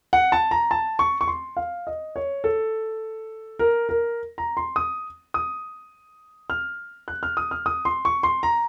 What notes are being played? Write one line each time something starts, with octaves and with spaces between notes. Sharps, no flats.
F#5
A5
A#5
A5
C#6
C#6
C6
F5
D#5
C#5
A4
A#4
A#4
A#5
C6
D#6
D#6
F6
F#6
F6
D#6
F6
D#6
C6
C#6
C6
A#5